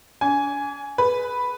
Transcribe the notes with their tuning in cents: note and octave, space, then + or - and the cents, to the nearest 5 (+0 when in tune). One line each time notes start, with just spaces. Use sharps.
D4 -40 G#5 +5
G#4 +30 B4 +0